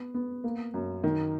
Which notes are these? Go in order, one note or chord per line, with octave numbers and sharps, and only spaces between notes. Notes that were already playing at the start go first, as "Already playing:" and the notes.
Already playing: B3
B3
A#3
F#2
D#3